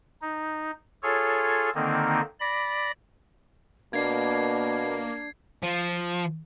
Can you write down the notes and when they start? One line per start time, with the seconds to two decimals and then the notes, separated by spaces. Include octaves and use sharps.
0.22 D#4
1.03 F4 G#4 A4 C#5
1.75 D3 D#3 A#3 C4 D#4
2.40 D5 B5 A#6
3.93 B2 A#3 D4 G#6 C7
5.63 F3